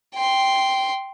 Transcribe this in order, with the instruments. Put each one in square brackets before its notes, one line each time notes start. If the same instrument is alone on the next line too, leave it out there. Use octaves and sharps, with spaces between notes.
[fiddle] G5 C6